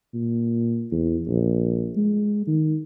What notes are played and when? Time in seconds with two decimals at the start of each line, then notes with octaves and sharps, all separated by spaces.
0.14 A#2
0.91 E2
1.27 A#1
1.96 G#3
2.47 D#3